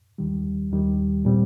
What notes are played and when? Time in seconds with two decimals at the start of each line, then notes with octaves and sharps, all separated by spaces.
0.18 D#2 D#3 G3
0.71 D#2 D#3 G3
1.25 A#2 G3 C4